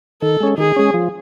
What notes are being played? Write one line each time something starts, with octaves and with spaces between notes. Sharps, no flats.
D#3 A4
G#3 C#4
D#3 G#4
G#3 C#4
F3